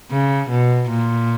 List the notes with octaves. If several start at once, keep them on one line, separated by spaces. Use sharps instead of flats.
C#3
B2
A#2